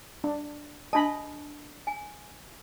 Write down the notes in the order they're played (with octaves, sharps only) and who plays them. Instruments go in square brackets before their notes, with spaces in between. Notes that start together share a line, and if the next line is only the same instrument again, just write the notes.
[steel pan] D4
[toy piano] D4 A5 [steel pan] D#5 B5
[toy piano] G#5